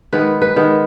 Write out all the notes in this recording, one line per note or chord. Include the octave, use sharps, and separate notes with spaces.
D#3 G#3 B3 B4
B4
D#3 G#3 B3